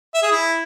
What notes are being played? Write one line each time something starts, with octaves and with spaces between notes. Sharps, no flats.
E5
G#4
E4